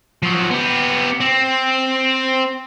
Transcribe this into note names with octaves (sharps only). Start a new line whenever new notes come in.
F3 F#3
B3 G4
C4